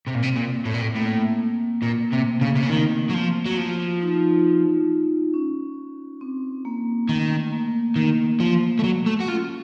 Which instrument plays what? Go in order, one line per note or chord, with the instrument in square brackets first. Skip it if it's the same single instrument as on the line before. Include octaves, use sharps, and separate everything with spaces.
[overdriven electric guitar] C3 [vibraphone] C4
[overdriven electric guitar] A#2
C3
A#2
A2
A#2
A2
[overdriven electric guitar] A2 [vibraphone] A#3
[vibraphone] A#3
[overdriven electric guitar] A#2 [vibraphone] A#3
[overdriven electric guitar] C3 [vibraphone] A3
[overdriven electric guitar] C#3 [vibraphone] A#3
[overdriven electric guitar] C3
C#3
[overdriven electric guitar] D#3 [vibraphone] C4
[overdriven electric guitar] F#3
F3
F#3
[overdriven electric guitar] F3 [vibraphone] F4
[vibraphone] D#4
C#4
C4
A#3
[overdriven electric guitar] D#3 [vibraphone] A3
[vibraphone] A#3
[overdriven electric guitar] D#3 [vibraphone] A#3
[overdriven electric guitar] F3
A3
F#3
A3
F#4
[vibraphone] C#4 [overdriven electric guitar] F4